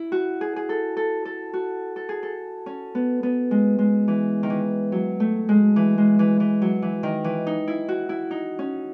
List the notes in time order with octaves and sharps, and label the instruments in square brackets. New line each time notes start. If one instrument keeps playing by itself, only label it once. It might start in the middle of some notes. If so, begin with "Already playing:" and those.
Already playing: [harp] E4
F#4
G#4
G#4
A4
A4
A4
F#4
A4
G#4
A4
C#4
B3
B3
G#3
G#3
E3
D#3
E3
F#3
A3
G#3
E3
G#3
E3
E3
F#3
E3
D#3
E3
D#4
E4
F#4
E4
D#4
C#4